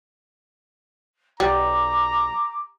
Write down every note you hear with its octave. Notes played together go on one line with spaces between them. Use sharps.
B1 G3 A#5 D6